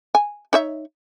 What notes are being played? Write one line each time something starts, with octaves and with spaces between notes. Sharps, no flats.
G#5
D#4 C#5 E5